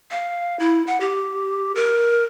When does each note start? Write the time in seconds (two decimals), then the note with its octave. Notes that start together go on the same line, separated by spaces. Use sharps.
0.11 F5
0.59 E4
0.87 F#5
1.00 G4
1.75 A#4